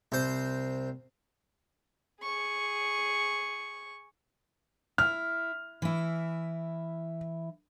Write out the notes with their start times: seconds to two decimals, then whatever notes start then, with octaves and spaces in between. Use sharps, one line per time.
0.12 C2 C5
2.22 G#4 C#6
4.98 E4 F6
5.82 E3 E4